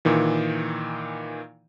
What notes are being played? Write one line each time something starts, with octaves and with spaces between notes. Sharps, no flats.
A#2 D#3 E3